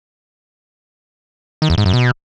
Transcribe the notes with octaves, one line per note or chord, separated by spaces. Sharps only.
D#3
E2
G#2
F#2
B2